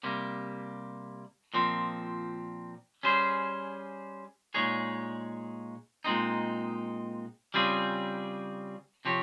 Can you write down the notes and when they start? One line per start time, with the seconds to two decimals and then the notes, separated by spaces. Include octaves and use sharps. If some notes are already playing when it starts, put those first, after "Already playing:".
0.03 C3 G3 A#3
1.54 A#2 F3 C4
3.03 G3 C#4 G#4 C5
4.54 A#2 G#3 D#4 G#4 C#5
6.04 A#2 G#3 C4 D#4
7.54 C#3 G3 C4 F4 G#4
9.05 C3 F3 C4 G4 C#5